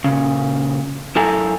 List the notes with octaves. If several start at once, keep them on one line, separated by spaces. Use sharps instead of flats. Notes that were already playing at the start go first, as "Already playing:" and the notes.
A#2 C#3
F#2 E4 A4 G#5 A#5